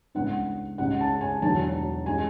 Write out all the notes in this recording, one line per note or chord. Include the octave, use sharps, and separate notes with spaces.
C#2 C#3 E3 B3 D4 F#5
C#2 C#3 G#3 C#4 F#5
A5
G#5
E1 E2 D3 F#3 B3 A5
E3 G#3 C#4 G#5